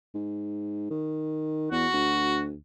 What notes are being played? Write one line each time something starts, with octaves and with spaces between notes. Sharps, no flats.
G#2
D#3
E2 F#4
D2